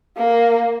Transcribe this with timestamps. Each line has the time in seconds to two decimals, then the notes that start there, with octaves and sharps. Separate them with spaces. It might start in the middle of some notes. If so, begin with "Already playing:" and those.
0.18 A#3